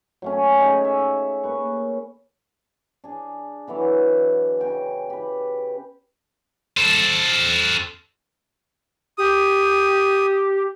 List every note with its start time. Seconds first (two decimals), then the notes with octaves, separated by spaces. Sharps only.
0.22 F#3 A3 C#4
0.61 D#4 G#4 C#5 A#5
0.85 E5
1.43 A#3 B4 C#6
3.04 D4 G#4
3.67 D3 E3 F#3 B3
4.60 C#3 G5 G#5
5.10 G4 B4
6.77 A4 C5
9.18 G4 D#6